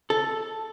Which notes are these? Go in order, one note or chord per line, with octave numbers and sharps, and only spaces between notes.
A4